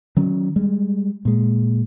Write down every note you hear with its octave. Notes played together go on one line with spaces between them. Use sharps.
D#3 F#3 C#4
G3 G#3
A#2 G#3